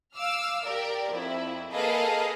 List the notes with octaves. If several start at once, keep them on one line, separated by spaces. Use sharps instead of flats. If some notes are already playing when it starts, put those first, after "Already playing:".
F5 D6 E6 F6
G4 A#4 D5
F2 E4
A#3 G#4 A4 B4 D#5 F5